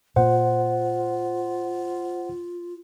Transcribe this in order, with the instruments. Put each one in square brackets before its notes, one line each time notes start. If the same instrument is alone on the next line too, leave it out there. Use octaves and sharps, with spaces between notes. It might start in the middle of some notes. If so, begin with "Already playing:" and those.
[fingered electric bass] A#2 A#3 [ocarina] F4 [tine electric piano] C5 F#5